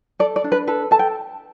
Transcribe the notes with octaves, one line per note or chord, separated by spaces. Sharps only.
A4 D5
D5
D4
B4
A4 B4
A4 A5
G5